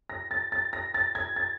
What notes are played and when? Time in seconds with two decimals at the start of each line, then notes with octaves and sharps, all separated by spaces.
0.10 A#6
0.31 A6
0.52 A6
0.73 A#6
0.94 A6
1.15 G#6
1.36 A6